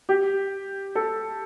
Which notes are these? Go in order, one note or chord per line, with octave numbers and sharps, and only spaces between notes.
G4
A4